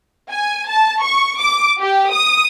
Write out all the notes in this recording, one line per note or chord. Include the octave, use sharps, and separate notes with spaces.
G#5
A5
C#6
D6
G4
D#6